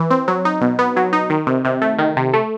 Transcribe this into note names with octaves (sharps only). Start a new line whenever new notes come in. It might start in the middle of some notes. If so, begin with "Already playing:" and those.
Already playing: E3
C4
F#3
D#4
B2
B3
F#3
D#4
D#3
C3
C3
A3
D#3
C3
A3